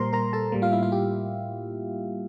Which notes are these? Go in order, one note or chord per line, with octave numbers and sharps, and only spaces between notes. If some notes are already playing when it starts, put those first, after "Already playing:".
Already playing: A#2 G3 A#3 A#4 C5 A#5 C6
A#4 A#5
A4 A5
A2 G3 A#3
F4 F5
E4 E5
F4 F5
G4